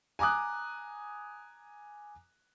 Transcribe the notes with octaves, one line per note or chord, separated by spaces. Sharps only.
G#5 A#5 D6 D#6 F#6